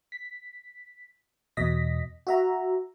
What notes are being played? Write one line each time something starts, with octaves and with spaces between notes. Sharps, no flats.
B6
E2 B2 D#5 A#6 B6
F#4 E5 A#5